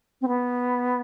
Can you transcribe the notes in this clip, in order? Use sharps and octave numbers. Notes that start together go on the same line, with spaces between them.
C4
B3